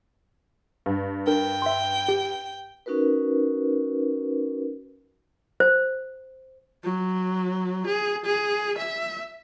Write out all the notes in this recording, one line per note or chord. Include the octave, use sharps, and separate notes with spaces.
G2
D4 A#4 G5
E5 C6
G4
C#4 D#4 F#4 A#4 B4
C5
F#3
G#4
G#4
E5